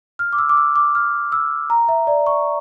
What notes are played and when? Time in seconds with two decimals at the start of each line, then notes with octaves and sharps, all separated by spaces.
0.19 F6
0.33 D6
0.38 E6
0.49 D6
0.57 E6
0.76 D6
0.95 F6
1.32 E6
1.70 A#5
1.89 E5
2.07 D5
2.26 C#6